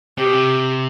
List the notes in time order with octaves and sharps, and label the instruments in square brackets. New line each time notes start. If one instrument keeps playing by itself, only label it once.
[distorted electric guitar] C3 [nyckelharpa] G4
[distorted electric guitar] B2
C3